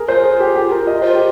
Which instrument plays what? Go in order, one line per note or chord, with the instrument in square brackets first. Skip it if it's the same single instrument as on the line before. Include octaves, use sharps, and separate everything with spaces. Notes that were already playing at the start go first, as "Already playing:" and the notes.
Already playing: [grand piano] G#4 A#4
[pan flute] F4 [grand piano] C5
[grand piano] G#4
G4
G4
A#4
D#5
[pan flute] F4 [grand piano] C5
[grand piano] G4